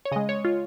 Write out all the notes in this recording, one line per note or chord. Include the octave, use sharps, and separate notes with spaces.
C#5
C#3 G#3 D#5
C#5
F4